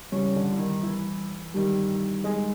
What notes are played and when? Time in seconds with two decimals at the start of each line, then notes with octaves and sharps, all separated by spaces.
0.12 G2 C#3 E3 G3 C#4
0.36 D3 D4
0.52 E4
0.59 D#3 D#4
0.83 E3 E4
1.54 G2 D#3 G3
2.24 G#3 G#4